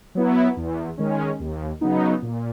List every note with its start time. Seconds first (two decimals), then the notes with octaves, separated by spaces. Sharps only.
0.15 F#3 B3 E4
0.57 E2
0.98 D#3 G#3 C#4
1.40 D#2
1.81 C#3 F#3 B3 D#4
2.22 A#2